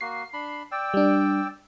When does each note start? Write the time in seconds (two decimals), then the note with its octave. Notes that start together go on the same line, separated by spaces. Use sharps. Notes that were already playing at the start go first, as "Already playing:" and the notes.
0.01 A#3 F#4 C7
0.33 D4 B5
0.72 D5 G5 E6
0.94 G3 D4